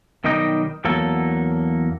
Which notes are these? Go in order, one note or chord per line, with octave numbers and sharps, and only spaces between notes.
B1 D#3 G3 D#5 G5 A#5
E2 F#3 A#3 A4